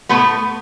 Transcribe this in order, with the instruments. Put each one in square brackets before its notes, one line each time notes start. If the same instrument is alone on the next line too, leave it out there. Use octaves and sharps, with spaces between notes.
[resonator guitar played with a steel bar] A2 F3 A3 B3 B4